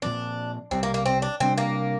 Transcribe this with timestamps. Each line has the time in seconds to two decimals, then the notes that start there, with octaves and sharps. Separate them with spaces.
0.02 A#2 F3 C4 D4
0.71 C2 C3 G3 C4
0.83 A#3
0.94 A#3
1.06 C4
1.22 D4
1.40 C3 G3 C4 D4
1.58 A#3